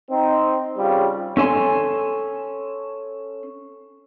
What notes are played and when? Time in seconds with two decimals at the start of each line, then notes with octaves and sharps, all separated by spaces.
0.11 C4 D#4
0.78 C#3 G3 C4 F4
1.37 C#4 A4 G#5 C6